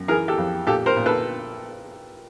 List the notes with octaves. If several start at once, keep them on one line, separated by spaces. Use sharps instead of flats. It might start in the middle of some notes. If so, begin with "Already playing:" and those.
Already playing: F#2
E3 G#4 A#4
G4 A4
F2
A#2 G4 A4
A#4 C5
A#2
A4 B4